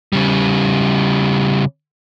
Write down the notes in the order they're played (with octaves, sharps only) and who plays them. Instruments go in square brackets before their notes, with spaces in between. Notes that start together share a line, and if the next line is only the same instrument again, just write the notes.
[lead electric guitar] C#3 G3